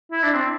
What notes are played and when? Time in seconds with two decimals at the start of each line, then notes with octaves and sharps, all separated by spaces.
0.12 E4
0.23 D4
0.34 C4